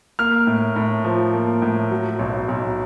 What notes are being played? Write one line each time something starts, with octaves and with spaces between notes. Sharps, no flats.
A#3 F6
A2
A2
F3
A#3
A2
F#3
B1
B1